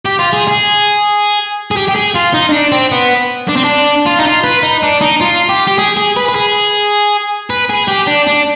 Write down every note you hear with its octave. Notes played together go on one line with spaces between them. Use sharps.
G4
F4
G#4
G#4
G#4
G4
G4
G#4
F4
D#4
D#4
D4
C4
B3
D4
C4
D4
F4
D#4
F4
B4
D#4
D4
D#4
F4
G4
G4
G#4
G#4
B4
B4
G#4
B4
G#4
G4
D4
D4